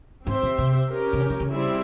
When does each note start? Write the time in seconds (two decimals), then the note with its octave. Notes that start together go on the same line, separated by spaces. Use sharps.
0.27 G#2 C4 G4 C5 E5
0.43 A#2
0.58 C3
0.90 C#4 G4 A#4
1.13 C3
1.20 C#3
1.30 E3
1.40 C#3
1.51 G3 C4 E4 G#4 E5